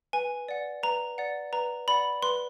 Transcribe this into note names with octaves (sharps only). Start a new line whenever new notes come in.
B4 G#5
D5 F#5
B4 A#5
D5 F#5
B4 A#5
D5 F#5 B5
B4 C6